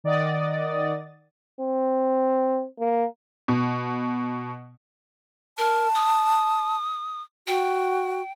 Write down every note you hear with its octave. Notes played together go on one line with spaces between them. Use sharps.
D#3 D5 D#5 F#5 D#6 A6
C4
A#3
B2
A#4 A5
D#6
F#4 G5